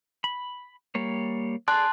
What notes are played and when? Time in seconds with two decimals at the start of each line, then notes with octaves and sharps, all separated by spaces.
0.24 B5
0.95 G3 A#3 C#5
1.68 G#4 D5 A5 C6 F#6